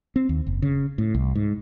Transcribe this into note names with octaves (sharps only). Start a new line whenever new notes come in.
C4
D#2
F#1
C#3
A2
C2
G#2